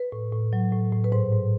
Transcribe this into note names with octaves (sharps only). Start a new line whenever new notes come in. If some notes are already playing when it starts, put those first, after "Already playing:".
Already playing: B4
A2
A2
F#3
A2
A2
B4
G#2 C5
G#2